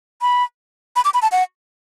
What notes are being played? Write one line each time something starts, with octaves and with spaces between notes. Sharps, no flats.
B5
B5
D6
B5
A5
F#5